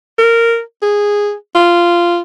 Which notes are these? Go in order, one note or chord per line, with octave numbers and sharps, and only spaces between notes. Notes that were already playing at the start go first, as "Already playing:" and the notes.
A#4
G#4
F4